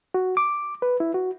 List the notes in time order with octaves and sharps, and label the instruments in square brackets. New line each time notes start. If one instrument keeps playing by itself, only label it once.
[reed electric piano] F#4
D6
B4
E4
F#4